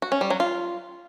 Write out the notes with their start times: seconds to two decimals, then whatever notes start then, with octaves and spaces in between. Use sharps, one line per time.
0.02 F#4
0.12 C#4
0.21 G3
0.30 F#3
0.40 F4